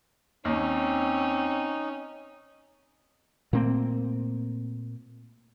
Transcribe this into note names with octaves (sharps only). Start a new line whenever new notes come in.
D#2 C4 C#4 D#4
A#2 A3 A#3 C4